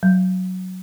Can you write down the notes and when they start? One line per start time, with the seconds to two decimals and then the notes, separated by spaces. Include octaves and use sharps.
0.03 F#3